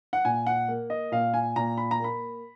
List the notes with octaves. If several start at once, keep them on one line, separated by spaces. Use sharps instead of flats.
F#5
A#2 G#5
F#5
A#3
D#5
A#2 F5
G#5
A#2 A#5
B5
A#5
A#3 B5